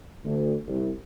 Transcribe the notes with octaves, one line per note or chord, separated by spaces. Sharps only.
D2
C2